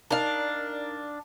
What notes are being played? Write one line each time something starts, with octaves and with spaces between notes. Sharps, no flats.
D4 D#4 A#4 D5 F5